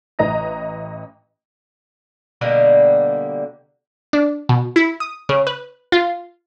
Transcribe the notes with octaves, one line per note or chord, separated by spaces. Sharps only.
A1 B4 D#5 A#5 A#6
B2 D3 G3 A#3
D4
B2
E4
D#6
C#3
B4
F4